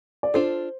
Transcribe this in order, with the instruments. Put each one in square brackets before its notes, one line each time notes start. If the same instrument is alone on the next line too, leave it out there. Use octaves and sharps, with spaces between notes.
[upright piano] D5
[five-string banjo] D4 F4 A4 [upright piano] C5